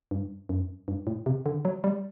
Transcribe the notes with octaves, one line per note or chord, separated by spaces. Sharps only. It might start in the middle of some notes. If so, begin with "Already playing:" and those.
G2
F#2
G2
A2
C3
D3
F#3
G3